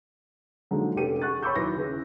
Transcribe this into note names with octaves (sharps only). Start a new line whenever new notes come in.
D3 F3 F#3 G#3 A#3 D#4
F1 C#4 G4 A4 D#7
G#4 F#5 C#6 F#6 A6
C#5 B5 C#6 D6 E6 G6
D#2 F#3 E4 B4 A#6
C#3 E4 G#4 B4